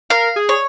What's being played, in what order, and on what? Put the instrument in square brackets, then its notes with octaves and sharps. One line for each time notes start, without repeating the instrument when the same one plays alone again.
[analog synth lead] A#4 [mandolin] F5
[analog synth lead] G#4
[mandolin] C#5